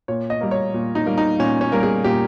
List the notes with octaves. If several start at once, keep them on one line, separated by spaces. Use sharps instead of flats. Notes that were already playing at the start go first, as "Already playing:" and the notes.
A#2 C#5
D#5
G3 A#3
C#5
A#2
D#4
G3 A#3
D#4
A#2 C#4
C#4
G3 A#3 A#4
G#4
A#2 G4